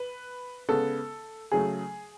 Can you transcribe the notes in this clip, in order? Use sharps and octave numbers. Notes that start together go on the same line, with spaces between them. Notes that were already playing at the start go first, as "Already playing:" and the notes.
Already playing: B4
C#3 G#3 B3 A4
C#3 F#3 A3 G#4